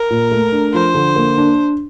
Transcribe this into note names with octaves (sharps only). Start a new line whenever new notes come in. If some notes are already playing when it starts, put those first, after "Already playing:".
Already playing: A#4
A#2
A3
D4
F3 C5
D3
A#3
D4